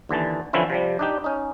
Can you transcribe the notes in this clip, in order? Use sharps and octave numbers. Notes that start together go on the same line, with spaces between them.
D#2 D3 E3 A5
D3 E3 F3 C4 C#4 E4
C3 F3 G3
D4 D#4 G4
C#4 D#4